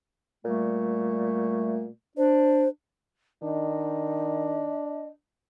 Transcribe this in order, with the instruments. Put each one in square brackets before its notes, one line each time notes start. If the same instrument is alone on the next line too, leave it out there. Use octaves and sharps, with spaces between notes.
[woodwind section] A#2 G3 A3
[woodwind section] D4 [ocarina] C5
[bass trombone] D#3 [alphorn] D4 [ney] D#5